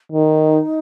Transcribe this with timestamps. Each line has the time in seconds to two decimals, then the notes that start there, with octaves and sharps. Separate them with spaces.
0.12 D#3 D#4